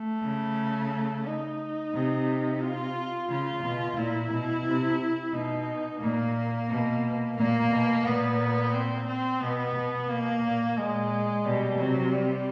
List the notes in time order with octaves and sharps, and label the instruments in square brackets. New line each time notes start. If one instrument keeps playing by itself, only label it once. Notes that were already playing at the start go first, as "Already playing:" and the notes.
Already playing: [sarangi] A3
[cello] C#3
[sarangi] D#4
[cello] C3
[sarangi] F4
[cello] C#3 [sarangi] F4
[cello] B2
[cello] A#2 [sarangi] E4
[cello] B2
C3
[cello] B2 [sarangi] D#4
[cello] A#2 [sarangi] A#3
[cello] B2
[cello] A#2 [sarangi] A#3
[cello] B2
[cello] A#2 [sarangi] B3
[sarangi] C4
C4
[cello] B2 [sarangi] B3
[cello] B2
[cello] B2 [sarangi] A#3
[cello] A#2
[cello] A#2 [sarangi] G#3
[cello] B2 [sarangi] G3
[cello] C3 [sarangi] F#3
[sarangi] G3